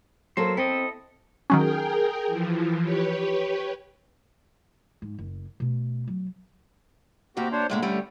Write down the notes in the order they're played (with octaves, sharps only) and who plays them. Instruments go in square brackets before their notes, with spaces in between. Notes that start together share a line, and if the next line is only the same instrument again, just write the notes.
[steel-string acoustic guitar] F#3 A#3 A4 [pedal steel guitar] C5
[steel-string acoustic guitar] C4 [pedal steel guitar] E4 A4 D#5
[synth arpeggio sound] D#3 F#3 C#4 [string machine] G#4 A#4 G5
[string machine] E3 F3
G4 B4 C#5
[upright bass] G#2
F#1
B2 A3
F#3
[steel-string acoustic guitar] D2 A#3 [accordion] C4 F#4 G4
[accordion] D4 C5 C#5
[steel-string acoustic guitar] A2 G#3 A#3 [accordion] D3
[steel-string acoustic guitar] G3 A3 C#4